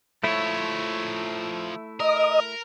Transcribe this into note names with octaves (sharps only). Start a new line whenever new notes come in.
F3 A3 E4 C#5
A#4 D#5